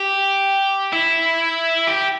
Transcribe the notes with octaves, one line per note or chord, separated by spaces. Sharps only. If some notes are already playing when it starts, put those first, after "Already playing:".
Already playing: G4
E4
G4